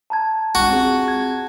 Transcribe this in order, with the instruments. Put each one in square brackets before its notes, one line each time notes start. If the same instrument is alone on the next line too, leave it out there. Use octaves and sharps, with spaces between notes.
[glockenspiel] A5 A#5 G#6
[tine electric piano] B1 G#3 D4 [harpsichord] F#4
[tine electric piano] C4 F4 G#4
[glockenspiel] G#6